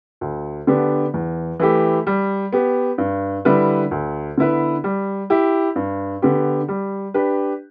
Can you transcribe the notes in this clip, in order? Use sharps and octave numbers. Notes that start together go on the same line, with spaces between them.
D2
D3 B3 D4 G4
E2
E3 A3 E4 G4
G3
B3 G4
G2
D3 G3 E4 B4
D2
D3 B3 E4 B4
G3
E4 G4
G2
D3 B3 G4
G3
D4 G4 B4